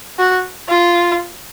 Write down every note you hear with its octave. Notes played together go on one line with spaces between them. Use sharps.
F#4
F4